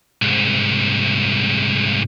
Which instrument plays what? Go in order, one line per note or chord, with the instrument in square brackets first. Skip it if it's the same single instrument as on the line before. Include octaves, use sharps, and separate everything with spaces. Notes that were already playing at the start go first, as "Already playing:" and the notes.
[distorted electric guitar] C2 G#2